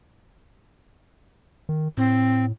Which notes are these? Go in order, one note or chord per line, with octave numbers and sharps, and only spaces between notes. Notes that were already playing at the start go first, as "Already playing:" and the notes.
D#3
A2 C4